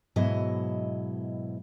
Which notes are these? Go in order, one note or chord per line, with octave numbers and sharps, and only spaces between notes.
G#2 B2 F#3 E4 D#5